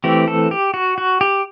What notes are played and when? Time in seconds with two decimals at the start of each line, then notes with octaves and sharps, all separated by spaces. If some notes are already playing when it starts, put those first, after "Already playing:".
0.04 E3 A3 C4 G4
0.28 A4
0.51 G4
0.74 F#4
0.98 F#4
1.21 G4